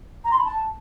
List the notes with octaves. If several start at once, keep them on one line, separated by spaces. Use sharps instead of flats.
A#5
C6
B5
A5